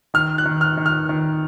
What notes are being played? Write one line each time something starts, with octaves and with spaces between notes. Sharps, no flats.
D#3 F6
F#6
D#3
F6
D#3
F6
D#3